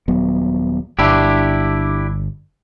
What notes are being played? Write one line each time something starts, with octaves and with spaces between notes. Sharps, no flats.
D#1 F#3 B3
G1 D4 E4 G4